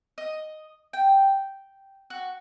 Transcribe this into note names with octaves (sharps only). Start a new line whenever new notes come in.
D#5
G5
F#4